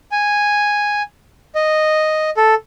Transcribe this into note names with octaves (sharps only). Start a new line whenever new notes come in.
G#5
D#5
A4